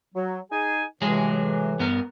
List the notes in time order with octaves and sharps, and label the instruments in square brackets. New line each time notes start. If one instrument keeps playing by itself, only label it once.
[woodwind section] F#3
D#4 G#4 G#5
[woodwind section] A2 C3 E3 [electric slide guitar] F#3 G#3 G#4
[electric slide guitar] G2 B3 A#4